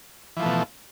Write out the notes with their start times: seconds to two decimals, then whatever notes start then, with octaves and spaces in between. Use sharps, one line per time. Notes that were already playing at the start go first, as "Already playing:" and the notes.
0.37 E3
0.39 F3
0.42 A3
0.45 B2